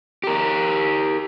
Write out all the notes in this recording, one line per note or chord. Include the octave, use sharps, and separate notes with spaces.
G4 A#4